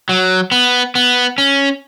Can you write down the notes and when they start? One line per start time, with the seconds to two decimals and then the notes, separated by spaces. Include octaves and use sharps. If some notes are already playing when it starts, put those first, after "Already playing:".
0.09 F#3
0.52 B3
0.95 B3
1.38 C#4